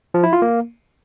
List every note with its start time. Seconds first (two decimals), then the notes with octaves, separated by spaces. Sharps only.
0.14 F3
0.24 E4
0.33 F4
0.42 A#3